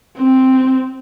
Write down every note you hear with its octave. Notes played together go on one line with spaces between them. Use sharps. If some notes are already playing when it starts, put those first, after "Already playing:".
C4